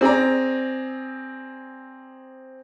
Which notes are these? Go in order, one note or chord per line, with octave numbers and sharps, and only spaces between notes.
C4 G#4 D5 A#5